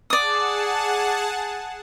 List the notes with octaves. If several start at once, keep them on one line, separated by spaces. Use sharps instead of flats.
G#4 D5 F#5 A5 D#6